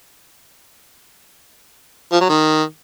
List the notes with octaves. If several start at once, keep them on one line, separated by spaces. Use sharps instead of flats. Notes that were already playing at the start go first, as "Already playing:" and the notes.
F3
F#3
D#3